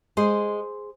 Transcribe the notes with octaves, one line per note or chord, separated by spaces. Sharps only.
G#3 G#4 C5